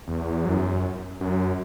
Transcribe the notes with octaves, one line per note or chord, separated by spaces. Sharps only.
E2
F#2
F#2